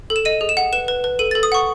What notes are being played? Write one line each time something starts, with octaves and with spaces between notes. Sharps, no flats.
A4
E7
D#5 D#7
G#4
E7
F#5
B4 E7
B4
B4
A4 D#7
A4 A6
D#6
F#5 C#6